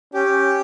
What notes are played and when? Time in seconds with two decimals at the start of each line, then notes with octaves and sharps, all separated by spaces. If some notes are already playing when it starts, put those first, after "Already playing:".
0.14 C#4 G4